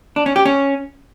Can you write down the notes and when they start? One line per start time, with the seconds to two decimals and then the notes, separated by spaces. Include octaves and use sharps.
0.16 D4
0.26 C#4
0.36 G4
0.45 C#4